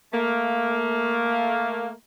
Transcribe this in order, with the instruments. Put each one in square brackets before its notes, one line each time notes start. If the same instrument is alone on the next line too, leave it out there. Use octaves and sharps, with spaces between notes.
[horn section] A3 A#3